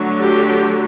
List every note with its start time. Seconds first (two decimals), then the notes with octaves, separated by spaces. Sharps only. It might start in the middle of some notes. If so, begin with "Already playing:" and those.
Already playing: D3 F#3 A3
0.20 G4